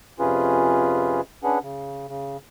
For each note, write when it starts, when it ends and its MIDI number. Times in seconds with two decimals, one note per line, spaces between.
0.19 1.21 41
0.19 1.21 48
0.19 1.21 61
0.19 1.21 65
0.19 1.21 68
0.19 1.21 71
1.43 1.59 61
1.43 1.59 62
1.43 1.59 68
1.43 1.59 71
1.43 1.59 78
1.62 2.07 49
2.08 2.37 49